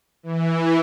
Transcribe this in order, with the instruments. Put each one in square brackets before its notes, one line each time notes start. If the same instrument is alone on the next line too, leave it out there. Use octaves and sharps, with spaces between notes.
[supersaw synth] E3